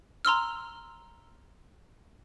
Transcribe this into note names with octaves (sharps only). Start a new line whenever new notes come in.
A#5 C6 E6 F6